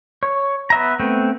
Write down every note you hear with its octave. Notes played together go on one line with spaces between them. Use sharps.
C#5
B3 E5 A#5
A3 B3 C4